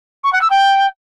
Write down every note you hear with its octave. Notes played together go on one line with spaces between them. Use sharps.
C#6
F#5
E6
G5